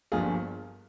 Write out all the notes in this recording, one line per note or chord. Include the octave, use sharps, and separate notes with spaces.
G1 G2 F3 A#3 F4 G#4